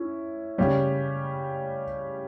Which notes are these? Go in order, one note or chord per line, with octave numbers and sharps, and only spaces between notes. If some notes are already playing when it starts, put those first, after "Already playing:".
Already playing: C#4 E4
C#3 G3 C#4